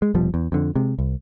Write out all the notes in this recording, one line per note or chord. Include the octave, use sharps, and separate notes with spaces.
G#3
F1 B2 F3 G3
E2
F2 D3
C3 G#3
C2